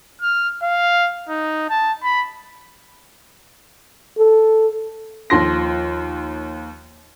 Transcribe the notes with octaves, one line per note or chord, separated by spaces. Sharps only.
F6
F5
D#4
A5
B5
A4
D#2 F3 C6 A#6